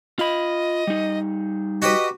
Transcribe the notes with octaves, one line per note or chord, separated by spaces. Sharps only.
F4 D#5 B5
G3 D#4
F#4 G4 B4 D#5